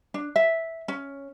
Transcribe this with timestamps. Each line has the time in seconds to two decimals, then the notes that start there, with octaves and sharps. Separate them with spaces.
0.14 D4
0.36 E5
0.88 C#4